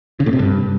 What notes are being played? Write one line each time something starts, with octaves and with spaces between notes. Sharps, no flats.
C#3
A2
C3
G2